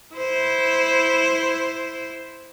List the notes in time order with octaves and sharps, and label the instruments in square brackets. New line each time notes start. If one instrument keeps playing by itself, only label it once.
[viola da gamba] E4 C5